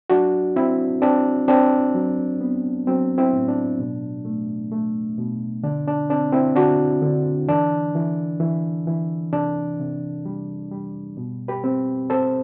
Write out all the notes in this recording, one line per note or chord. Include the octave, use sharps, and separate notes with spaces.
F#3 D4 F#4
C4 E4
C4 D4
C4 D4
F#3
B3
F#3 C4
C4 E4
A2
D4
B2
A3
A3
B2
D3 D4
D4
C4 D4
C4 E4
D3 D4 F#4
D3
E3 D4
E3
E3
E3
C3 D4
C3
G3
G3
B2
G4 B4
C4
C4 A4 C5